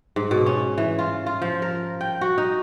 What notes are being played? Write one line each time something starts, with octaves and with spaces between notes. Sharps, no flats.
G#2
B2
C#4
E3
F4
F4
F3
A#4
G5
F#4
D#4